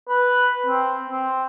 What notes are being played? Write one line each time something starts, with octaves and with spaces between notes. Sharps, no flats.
B4
C4
C4